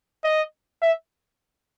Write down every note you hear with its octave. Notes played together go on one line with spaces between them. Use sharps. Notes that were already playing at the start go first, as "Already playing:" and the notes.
D#5
E5